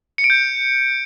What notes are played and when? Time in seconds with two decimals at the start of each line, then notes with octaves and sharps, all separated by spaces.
0.18 C#7
0.24 D7
0.30 G6